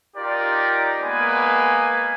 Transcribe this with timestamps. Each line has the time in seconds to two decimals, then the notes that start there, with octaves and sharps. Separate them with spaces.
0.16 D#4 F4 G4 A#4 D5
1.01 G#3 A#3 B3 B4 G#5